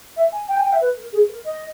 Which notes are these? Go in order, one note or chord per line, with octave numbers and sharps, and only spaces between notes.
E5
G#5
G5
G#5
G5
E5
B4
A#4
G#4
A#4
D#5